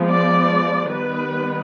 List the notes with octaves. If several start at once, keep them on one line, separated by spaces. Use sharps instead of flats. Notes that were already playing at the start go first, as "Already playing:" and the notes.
Already playing: F3 G#3 B3
D5
D#3 G3 B3 B4